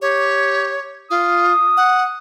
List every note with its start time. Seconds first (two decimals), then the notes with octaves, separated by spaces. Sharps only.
0.02 G4 C#5
1.10 F4 D#6
1.77 F#5